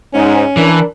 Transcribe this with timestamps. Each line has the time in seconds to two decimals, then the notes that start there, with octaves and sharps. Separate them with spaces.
0.14 G#2 C#4
0.57 E3 D4 A#4